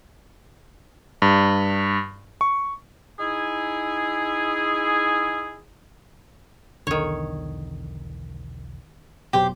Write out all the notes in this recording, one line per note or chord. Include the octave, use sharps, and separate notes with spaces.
G2
C#6
D#4 E4 G#4
B1 E2 D3 D#3 C#5
F1 B2 F#3 G4 C5